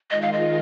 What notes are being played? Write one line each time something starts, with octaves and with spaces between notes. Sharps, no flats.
D#3 G#3 F4 D#5
F5
D#5